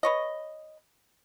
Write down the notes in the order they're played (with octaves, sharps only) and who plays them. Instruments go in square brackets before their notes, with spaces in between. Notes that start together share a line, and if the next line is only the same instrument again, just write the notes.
[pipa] B4 C#5 D#5